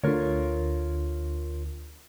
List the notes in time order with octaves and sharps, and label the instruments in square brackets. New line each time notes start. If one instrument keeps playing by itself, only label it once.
[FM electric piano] D2 D3 [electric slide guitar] F4 A#4 C#5